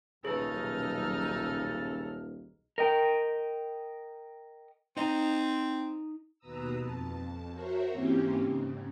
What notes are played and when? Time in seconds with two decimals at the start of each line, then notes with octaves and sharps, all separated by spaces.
0.25 D#1 B1 C#3 D#4 G#4 A4 B4 F6
2.78 A#4 D#5 G5
4.97 C4 D#4 D#5 A#5
6.39 D#2 B2 B4 A#5 D#6 E6
6.79 F2 A5
7.51 F#4 A#4 C5 C#5 E5
7.91 G#2 E3 A#3 C4 C#4 G4
8.42 G#2 C#3